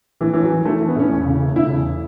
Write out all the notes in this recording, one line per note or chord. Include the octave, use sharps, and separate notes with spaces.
A2 E3
E3 C#4
F#3
E3
E3 A3
E3
B3
A2 C#4
E2
C#3
A3
C#3 E4
E2